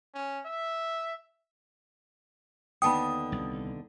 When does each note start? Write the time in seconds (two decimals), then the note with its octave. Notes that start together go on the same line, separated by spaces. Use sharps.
0.14 C#4
0.45 E5
2.82 D#2 D3 B3 G5 A5 B5 D#6
3.32 C2